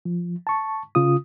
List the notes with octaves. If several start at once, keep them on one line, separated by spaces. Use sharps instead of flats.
F3
A5 C#6
C#3 F4 D#6